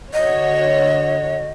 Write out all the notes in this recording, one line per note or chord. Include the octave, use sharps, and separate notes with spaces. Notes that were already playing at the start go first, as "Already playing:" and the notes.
D3 F#4 C#5 D#5